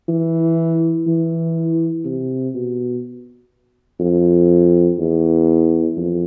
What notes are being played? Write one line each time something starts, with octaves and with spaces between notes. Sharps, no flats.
E3
E3
C3
B2
F2
E2
F2